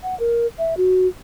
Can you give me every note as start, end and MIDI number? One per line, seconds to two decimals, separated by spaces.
0.03 0.18 78
0.20 0.46 70
0.58 0.74 76
0.77 1.07 66